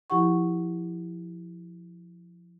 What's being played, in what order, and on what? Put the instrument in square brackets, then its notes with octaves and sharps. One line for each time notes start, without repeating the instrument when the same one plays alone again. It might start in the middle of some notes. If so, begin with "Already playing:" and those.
[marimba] F3 E4 G4 F#5 C#6